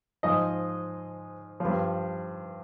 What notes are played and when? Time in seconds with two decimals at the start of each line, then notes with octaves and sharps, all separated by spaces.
0.23 G#2 F3 D#5
1.60 G2 F3